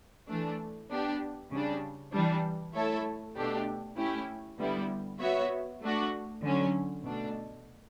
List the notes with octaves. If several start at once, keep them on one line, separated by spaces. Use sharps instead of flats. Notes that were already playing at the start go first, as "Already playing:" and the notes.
E3 A3 D4
B3 D4 G4
C#3 G3 D4
E3 G3 D4
A3 E4 A4 C#5 E5
B2 A3 D4 G4
A3 C#4 E4 G4
D3 G3 B3 E4
B3 F#4 C#5 E5
A3 D4 F#4
D3 F#3 C#4
B2 A3 D4